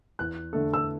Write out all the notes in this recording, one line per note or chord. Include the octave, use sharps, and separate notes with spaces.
E2 F#6
D3 A3 D4 A4
E6